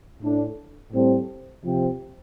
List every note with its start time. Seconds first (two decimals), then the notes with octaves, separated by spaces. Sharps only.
0.21 A2 A3 D4
0.92 A2 G3 C4 A4
1.63 C3 F3 C4